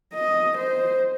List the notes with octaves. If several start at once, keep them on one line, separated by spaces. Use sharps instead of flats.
D#5
C5